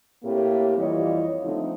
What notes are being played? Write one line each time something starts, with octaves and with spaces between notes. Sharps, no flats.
A2 A#3 C4 G4
F2 E3 G3 F4 C#5 D#5
D3 F3 A3 C4 D#4